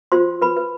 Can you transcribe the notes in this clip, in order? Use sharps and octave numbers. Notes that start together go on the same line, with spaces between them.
F4 C5 C6
B4 B5
B4